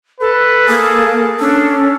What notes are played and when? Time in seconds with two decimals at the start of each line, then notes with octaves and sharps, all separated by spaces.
0.20 A4 B4
0.68 A#3 G#4
1.40 C#4 D4 A4